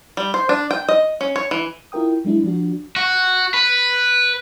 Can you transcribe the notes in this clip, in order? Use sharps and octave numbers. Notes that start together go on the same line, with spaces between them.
G3
C5
D4
G5
D#5
C#4
C#5
E3
E4 F4 A#4 G5 D#6
F#3 G#3 D4 E4
F3 D4 F#4
F#4
B4